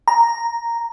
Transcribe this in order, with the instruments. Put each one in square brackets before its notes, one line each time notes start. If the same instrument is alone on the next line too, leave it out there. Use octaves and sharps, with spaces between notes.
[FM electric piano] A#5